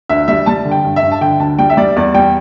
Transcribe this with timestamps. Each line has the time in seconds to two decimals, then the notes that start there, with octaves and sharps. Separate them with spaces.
0.09 D2 E5
0.28 G3 E5
0.46 G3 A5
0.65 D3
0.71 G5
0.84 G2
0.96 E5
1.03 G2
1.12 A5
1.21 D3 G5
1.40 D2 A5
1.59 G3 G5
1.70 E5
1.77 G3 D5
1.96 E2 D5
2.14 G3 G5